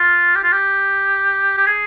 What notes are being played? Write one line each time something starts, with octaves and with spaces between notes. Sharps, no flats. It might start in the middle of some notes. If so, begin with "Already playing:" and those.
Already playing: F4
G4
F4
G4
G4
G#4